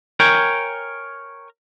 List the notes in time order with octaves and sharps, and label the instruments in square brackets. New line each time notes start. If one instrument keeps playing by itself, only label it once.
[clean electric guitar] A#4 C#5 G5 G#5